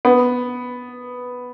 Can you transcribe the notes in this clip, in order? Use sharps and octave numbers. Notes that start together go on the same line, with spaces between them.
B3